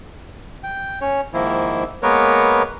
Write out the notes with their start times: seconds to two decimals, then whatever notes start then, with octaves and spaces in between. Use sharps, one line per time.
0.64 G5
1.01 C#4 C#5
1.34 G#2 D#3 F3 A#3 E4
2.03 G#3 A#3 B3 A#4 B4 C#5